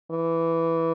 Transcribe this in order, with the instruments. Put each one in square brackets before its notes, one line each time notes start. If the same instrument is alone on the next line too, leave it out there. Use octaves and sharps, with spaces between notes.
[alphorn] E3